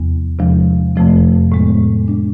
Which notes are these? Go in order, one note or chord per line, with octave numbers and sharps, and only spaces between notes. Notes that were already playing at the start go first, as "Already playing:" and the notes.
Already playing: E2 C3 F3 B3
E2 C3 F3 G#3 D4
F2 C3 F3 A3 C4
A2 G#3 B3
G#3 D4